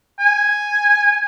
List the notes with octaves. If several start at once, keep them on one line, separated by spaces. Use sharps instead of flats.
G#5